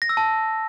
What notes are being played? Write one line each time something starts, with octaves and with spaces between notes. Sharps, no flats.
A#6
E6
A5